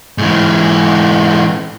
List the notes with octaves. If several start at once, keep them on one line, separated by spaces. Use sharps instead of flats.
G#2 E3